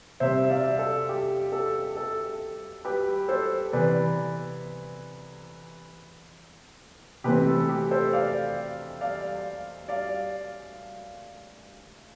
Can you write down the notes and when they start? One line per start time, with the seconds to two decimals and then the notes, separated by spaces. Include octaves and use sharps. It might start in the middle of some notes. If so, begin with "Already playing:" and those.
0.20 C3 G3 C4 C5 E5
0.44 E5
0.50 D5 F5
0.79 A4
1.09 G4
1.52 A4
1.97 A4
2.85 G4 B4
3.28 A4 C5
3.73 C3 E3 B3 B4 D5
7.24 C3 E3 A3 C4 G4 B4
7.47 A4
7.69 G4
7.91 A4 C5
8.13 D5 F5
9.01 D5 F5
9.89 D5 F5